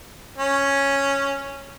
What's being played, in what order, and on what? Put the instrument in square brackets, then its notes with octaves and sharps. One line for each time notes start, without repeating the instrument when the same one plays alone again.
[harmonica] C#4